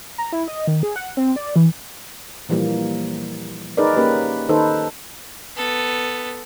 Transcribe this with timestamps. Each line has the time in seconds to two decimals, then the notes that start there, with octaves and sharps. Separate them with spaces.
0.18 A#5
0.33 E4
0.48 D#5
0.67 D#3
0.83 G#4
0.96 F#5
1.17 C4
1.36 D5
1.56 E3
2.49 A#2 E3 F3 G3 A#3
3.77 D#4 G#4 A#4 B4 D5
3.96 A#3 C#4 G4 B4
4.49 D#3 D#4 A4 B4 C5
5.55 B3 A4